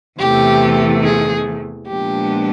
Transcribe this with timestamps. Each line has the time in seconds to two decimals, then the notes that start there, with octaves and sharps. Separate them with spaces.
0.19 E2 C3 E3 A3 G4
1.04 G#4
1.88 A#2 F3 G#3 B3 D4 G4